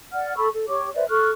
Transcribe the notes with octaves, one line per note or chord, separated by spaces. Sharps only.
D5 F#5 F6
A4 B5 C#6 E6
A4
G4 C#5 C#6 D6
B4 C5 D5 E5
A4 C#6 F6 F#6